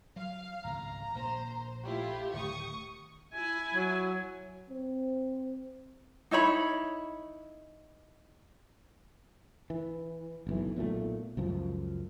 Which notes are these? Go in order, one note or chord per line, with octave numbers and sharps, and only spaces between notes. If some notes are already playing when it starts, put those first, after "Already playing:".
F#3 F5
G#1 C#2 A#5
A#1 A#3 C5
A3 E4 F4 G4
D1 D#3 A3 C#6 D#6
E4 G#5
F#3
C4
D#4 E4 C#5 B5
E3
F#1 B1 E3
B1 A#2 E3 A3
C#2 F#2 F3